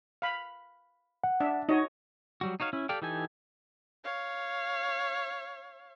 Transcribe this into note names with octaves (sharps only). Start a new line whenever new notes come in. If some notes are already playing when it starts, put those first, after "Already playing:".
F5 B5
F#5
D4 E5
D#4 F#4 C#5 D#5
F#3 G3 F#4
D#4 F#4 C#5 F5
C#4 E4
G4 A4 D5 F5 G5
E3 D#4 G4 A4 G#5
C#5 F5